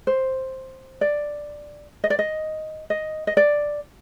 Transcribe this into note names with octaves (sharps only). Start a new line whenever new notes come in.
C5
D5
D#5
D5
D#5
D#5
D#5
D5